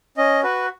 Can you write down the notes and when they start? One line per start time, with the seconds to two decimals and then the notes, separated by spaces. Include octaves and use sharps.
0.17 C#4 D#5
0.43 F#4 B4